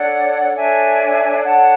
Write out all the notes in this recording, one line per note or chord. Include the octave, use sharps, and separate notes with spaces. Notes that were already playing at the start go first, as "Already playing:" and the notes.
Already playing: D4 A4 C#5 D5 F#5
D4 A4 C#5 E5 G#5
D4 A4 C#5 F#5 A5